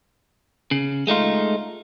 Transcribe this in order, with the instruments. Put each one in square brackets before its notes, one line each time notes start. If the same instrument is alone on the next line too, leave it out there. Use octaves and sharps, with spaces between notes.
[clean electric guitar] C#3
G#3 A3 D#4 F4